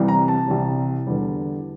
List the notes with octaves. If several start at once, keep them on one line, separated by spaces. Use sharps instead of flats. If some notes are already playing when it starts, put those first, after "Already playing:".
Already playing: C2 C3 E3 G3
A#5
A5
C2 C3 E3 G3
E2 D3 G3